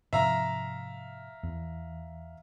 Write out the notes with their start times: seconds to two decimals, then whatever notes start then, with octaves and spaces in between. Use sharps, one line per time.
0.13 G#2 C3 F3 E5 F5 A#5
1.43 E2